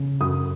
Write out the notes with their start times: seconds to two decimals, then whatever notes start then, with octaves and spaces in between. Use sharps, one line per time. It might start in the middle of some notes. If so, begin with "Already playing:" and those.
Already playing: C#3
0.21 F#2 D#6